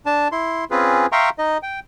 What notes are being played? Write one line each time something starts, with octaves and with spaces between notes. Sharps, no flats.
D4 A5
E4 C6
C4 C#4 F4 G#4 B4
E5 F5 G5 A#5 C6 C#6
D#4 D#5
G5